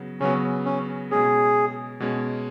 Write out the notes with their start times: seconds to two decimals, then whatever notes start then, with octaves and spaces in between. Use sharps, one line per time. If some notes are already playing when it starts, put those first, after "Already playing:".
Already playing: C#3 F#3 B3
0.20 C#3 F#3 B3 C#4
0.65 C#4
1.11 B2 G#3 C#4 G#4
2.00 B2 G#3 C#4